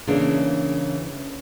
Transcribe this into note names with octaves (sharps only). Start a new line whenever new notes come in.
C#3 E3 A#3 D4